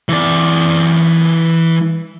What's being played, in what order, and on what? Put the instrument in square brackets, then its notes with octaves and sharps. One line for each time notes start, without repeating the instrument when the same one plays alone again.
[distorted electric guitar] E3 D5